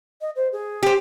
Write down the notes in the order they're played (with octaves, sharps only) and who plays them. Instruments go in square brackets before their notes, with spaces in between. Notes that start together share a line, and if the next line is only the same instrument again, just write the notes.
[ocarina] D#5
C5
G#4
[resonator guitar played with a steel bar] G4 C5